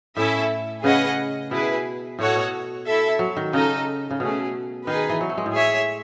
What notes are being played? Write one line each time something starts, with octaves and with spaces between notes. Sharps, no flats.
A2 C#4 E4 A4 E5
C#3 C#4 G#4 B4 D#5 F#5
B2 E4 G#4 B4
A2 F#4 A4 C#5 F#5
B2
E4 A4 E5
F#3
D#3
C#3 D#4 A4 D#5
C#3
B2 A3 C#4 G#4
D#3 D#4 G#4 B4
E3
F#3
A3
G#3
A2
G#4 C#5 E5